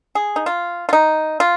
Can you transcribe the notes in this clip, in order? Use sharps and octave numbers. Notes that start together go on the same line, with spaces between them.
G#4
D#4
F4
F4
D#4
F4